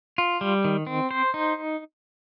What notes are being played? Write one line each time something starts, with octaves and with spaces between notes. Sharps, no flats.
F4
G3
D#3
C4
C5
D#4